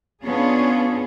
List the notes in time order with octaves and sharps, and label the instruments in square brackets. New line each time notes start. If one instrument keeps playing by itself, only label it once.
[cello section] B3 C#4 D4 F4 G#4